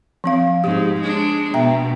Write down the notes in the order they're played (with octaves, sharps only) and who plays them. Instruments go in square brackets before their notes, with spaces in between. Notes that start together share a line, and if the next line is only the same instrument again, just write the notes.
[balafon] F3 C4 F5
[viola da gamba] G#2 [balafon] G4
[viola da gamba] G#3 D4
[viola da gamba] B2 [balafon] E5 G5 A#5